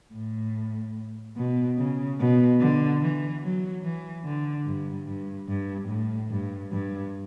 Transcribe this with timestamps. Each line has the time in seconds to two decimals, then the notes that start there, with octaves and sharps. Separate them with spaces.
0.13 A2
1.37 B2
1.78 C#3
2.19 B2
2.60 D3
3.01 E3
3.42 F#3
3.83 E3
4.25 D3
4.66 G2
5.07 G2
5.48 G2
5.89 A2
6.30 G2
6.71 G2